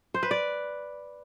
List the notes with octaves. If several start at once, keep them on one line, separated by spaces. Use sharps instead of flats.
C5
B4
D5